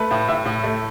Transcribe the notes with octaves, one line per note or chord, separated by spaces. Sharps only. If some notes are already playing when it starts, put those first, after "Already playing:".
Already playing: A3 B4
A2
A2 E5
A2
A3